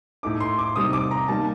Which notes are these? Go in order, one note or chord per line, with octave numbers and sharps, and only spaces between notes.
A2 A3 D#4 D6
C6
D6
C3 G3 C4 D#4 D#6
D6
A#5
D#3 G3 A#3 D#4 A5